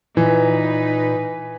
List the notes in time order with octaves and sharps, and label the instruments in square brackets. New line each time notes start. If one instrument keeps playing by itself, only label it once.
[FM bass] A#2 [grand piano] E3 [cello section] D#4 B4